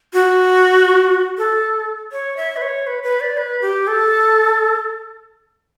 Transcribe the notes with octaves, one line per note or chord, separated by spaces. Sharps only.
F#4
A4
C#5
E5
B4
C#5
B4
B4
D5
B4
G4
A4